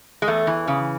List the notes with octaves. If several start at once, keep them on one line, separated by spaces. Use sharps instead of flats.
G#3
E2 A3
E3
C#3